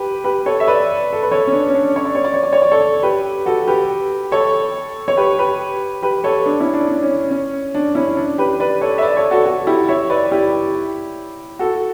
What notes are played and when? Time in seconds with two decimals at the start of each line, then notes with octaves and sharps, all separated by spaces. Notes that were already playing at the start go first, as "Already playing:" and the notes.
Already playing: G4 B4
0.24 G4 B4
0.46 A4 C#5
0.60 E5
0.67 B4 D5
1.13 A4
1.22 B4
1.32 A4 C#5
1.47 C#4
1.53 D4
1.68 C#4
1.75 D4
1.96 C#5
2.05 D5
2.15 C#5
2.24 D5
2.34 C#5
2.43 D5
2.53 C#5
2.62 D5
2.71 A4 C#5
3.03 G4 B4
3.46 F#4 A4
3.68 G4 B4
4.32 A4 C#5
5.08 C#5
5.17 G4 B4
5.39 G4 B4
6.03 G4 B4
6.24 A4 C#5
6.46 D4
6.60 C#4 E4
6.74 D4
6.88 D4
7.03 C#4
7.31 C#4
7.75 D4
7.95 C#4 E4
8.17 D4
8.38 G4 B4
8.60 B4 D5
8.81 A4 C#5
8.98 E5
9.03 B4 D5
9.17 A4 C#5
9.31 F#4 A4
9.46 F#4 A4
9.67 E4 G4
9.88 C#5 E5
10.10 B4 D5
10.31 E4 G4
11.59 F#4 A4